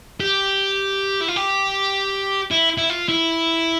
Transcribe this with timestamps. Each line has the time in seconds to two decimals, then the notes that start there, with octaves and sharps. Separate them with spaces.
0.20 G4
1.21 E4
1.28 F4
1.36 G4
2.51 E4
2.78 E4
2.90 F4
3.09 E4